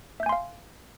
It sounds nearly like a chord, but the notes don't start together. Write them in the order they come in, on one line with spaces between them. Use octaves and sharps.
E5 G6 G#5 C6 F5